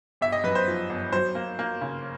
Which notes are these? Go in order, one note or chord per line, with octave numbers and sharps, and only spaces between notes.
G1 E5
D#5
F#2 B4
C5
F3
G1
F#3 C5
A#3
A#3
C#3